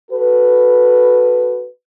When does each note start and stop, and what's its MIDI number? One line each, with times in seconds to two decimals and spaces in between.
0.11 1.66 66
0.11 1.66 69
0.11 1.66 71